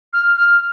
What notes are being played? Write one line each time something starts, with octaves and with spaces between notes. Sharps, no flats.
F6
F6